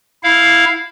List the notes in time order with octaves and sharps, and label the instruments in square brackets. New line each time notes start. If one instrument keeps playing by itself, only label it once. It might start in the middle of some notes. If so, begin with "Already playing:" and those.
[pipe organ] E4 F5